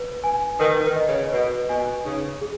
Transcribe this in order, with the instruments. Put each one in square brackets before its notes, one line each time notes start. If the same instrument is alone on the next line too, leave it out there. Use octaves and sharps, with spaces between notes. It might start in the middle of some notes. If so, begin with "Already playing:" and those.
Already playing: [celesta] B4
G#5
[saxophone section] D#3 [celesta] B4
[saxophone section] D#3
[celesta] D#5
[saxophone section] C#3
[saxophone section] B2 [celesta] B4
[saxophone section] B2 [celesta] G#5
[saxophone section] C#3 [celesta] D#4
[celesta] G#4